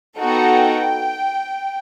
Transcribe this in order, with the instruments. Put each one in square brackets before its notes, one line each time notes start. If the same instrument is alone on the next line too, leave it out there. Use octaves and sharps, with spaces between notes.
[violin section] B3 D#4 F#4 A4 G5